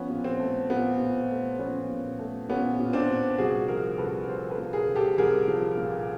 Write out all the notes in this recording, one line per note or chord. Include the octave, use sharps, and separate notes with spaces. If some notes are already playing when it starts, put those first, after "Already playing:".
Already playing: F3 B3 C#4
A#2
C4
A3
A#2 B3
A#2
A3
F3 B3 C#4
A#2
A3
A#2 B3 C#4
A#2
C4 D4
A#2
C2 F#4 G#4
F3 G#4 A#4
C2 A4 B4
F3 A#4 C5
A4 B4
A#2
G#4 A#4
C2
G4 A4
C2 G#4 A#4
F3
A#2